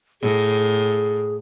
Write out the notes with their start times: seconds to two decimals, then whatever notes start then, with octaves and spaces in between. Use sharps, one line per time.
0.22 A2 G#4